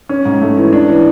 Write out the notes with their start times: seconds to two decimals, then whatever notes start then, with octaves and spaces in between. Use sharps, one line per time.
0.09 C#4
0.25 G#2
0.41 A3
0.57 E3
0.73 D4
0.88 E3